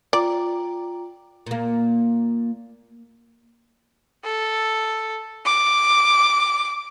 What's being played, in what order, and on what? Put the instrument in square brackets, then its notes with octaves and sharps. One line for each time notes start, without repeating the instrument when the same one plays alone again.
[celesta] F4 G5 A#5 [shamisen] D5
[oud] A#2 A#3
[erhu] A4
D6